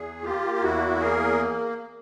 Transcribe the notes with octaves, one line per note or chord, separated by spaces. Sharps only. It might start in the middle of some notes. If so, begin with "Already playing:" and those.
Already playing: E2 G#4
A#3 F4 G4
F4
E2 E4 F#4
A#3 G#4 A#4